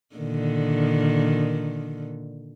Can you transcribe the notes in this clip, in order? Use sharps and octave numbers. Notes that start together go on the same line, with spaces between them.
A#2 D3 D#3